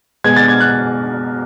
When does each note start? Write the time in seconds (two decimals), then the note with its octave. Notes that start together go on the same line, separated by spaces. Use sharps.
0.24 B2 G#3 B3 G#6
0.36 A6
0.48 G#6
0.60 F#6